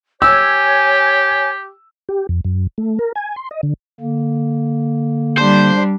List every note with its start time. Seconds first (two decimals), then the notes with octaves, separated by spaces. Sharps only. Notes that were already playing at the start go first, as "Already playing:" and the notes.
0.22 G4 C#5 G#5 E6
2.09 G4
2.29 F2
2.45 F#2
2.78 A3
2.99 A#4
3.15 G#5
3.36 C6
3.51 D#5
3.63 D3
4.00 D3 A#3
5.37 G3 D4 C5